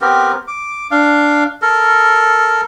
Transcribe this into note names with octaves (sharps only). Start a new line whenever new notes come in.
B3 C4 G4 A#4
D6
D4 F5
A4 A#4